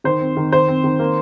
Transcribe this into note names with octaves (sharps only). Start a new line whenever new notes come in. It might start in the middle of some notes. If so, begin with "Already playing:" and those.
D#3 C5
C4
D#3
D#3 C5
C4
D#3
A#3